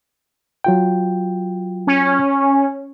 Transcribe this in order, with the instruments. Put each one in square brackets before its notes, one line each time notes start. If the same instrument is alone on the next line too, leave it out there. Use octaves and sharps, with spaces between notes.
[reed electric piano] F#3 F4 G5
[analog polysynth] C#4